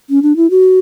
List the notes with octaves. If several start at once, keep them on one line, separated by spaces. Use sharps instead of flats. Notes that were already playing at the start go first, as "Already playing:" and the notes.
C#4
D4
E4
F#4